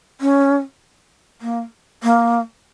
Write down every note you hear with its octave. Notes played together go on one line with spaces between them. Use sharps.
C#4
A#3
A#3